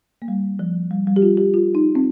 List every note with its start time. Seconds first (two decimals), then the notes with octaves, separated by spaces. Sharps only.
0.22 A#3
0.28 G3
0.59 F3
0.91 G3
1.07 G3
1.16 G4
1.22 F4
1.37 G4
1.54 F4
1.75 D#4
1.95 C4